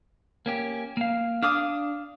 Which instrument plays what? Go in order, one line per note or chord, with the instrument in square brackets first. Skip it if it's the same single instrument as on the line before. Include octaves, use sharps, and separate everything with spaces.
[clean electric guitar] A#3 C#4 G4
A#3 F5
[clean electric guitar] D4 [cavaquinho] F5 D6 D#6